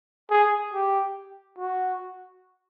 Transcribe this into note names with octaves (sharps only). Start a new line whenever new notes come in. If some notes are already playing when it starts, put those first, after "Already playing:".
G#4
G4
F#4